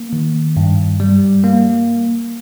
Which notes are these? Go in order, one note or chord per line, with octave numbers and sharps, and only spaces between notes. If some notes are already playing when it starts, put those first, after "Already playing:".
Already playing: A#3
D#3
G2
G3
A#3